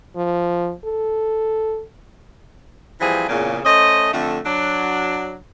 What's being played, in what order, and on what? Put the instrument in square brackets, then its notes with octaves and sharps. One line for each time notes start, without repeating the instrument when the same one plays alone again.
[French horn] F3
A4
[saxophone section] E3 F3 G3 C4 G#4
E2 A#2 C#3
A3 C#4 C5 D#5
F2 D3 A3
F#3 D4